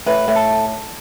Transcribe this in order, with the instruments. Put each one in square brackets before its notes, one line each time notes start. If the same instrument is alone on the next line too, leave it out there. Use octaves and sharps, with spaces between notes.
[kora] A2 [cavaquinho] B4
[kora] A2
[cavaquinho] A4